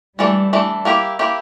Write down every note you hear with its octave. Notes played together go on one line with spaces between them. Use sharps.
E3 G3 A3 D4 A4
E3 A3 D4 A4
A#3 E4 G4
A#3 E4 G4